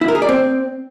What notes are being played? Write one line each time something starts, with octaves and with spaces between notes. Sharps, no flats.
E4
A#4
G#4
D5
C4